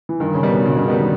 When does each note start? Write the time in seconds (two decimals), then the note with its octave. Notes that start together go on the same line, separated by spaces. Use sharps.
0.09 E3
0.20 G2 D#3
0.35 C#3
0.43 G3 B3 D#4
0.50 B2
0.65 G2 C#3
0.77 C#3
0.87 D#3 G3 B3 D#4
0.99 D#3